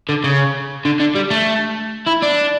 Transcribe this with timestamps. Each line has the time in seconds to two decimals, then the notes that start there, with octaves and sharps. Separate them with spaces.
0.09 D3
0.24 C#3
0.85 D3
1.00 D3
1.15 G3
1.31 A3
2.06 E4
2.22 D4